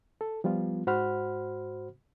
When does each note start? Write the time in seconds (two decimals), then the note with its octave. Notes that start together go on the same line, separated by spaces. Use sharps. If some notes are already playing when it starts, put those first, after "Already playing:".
0.21 A4
0.44 F3 G3 B3 F4
0.87 G#2 F#4 C5 F#5 B5 F6